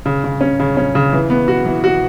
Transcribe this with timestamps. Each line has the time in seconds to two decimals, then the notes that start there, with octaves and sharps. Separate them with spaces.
0.06 C#3
0.24 C#3
0.41 C#4
0.60 C#3
0.77 C#4
0.95 C#3
1.13 E3
1.30 B3
1.48 F#4
1.66 E3
1.84 F#4